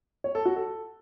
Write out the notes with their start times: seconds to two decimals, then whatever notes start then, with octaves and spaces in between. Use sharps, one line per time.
0.24 C#5
0.35 A4
0.45 F#4
0.56 A4